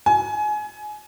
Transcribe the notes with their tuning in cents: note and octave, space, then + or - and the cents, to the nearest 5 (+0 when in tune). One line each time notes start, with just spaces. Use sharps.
G#5 +25